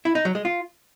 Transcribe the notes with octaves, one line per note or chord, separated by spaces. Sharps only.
E4
D#4
F#3
G#3
F4